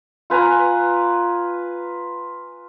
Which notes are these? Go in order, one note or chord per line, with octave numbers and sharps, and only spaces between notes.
F4 B4 G#5 A#5